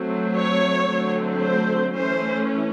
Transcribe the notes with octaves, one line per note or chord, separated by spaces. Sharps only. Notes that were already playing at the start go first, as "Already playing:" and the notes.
Already playing: F#3 A3 C4
C#5
D3 F#3 A3 C4
C5
E3 A3 C#4 C5